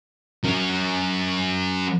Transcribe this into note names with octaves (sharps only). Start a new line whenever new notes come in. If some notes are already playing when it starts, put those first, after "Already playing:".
F#3 C#4